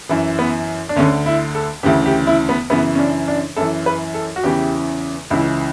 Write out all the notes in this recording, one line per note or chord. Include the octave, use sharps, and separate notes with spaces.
F#2 E3
B3
D4
D2 D3 C#4
E4
A4
D2 C#3 E3 G4
G4
E4
B3
F#2 C#3 E3 B3
C#4
D4
D4
F#2 E3 A4
B4
A4
F#4
E2 C#3 E3 G4
C#2 C#3 E3 E4